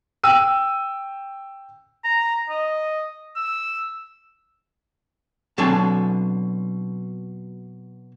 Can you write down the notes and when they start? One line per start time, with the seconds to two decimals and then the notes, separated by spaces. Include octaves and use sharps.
0.24 G5 E6 D#7
2.04 A#5
2.50 D#5
3.36 E6
5.58 B2 F#3 C4 D4 A4 G#5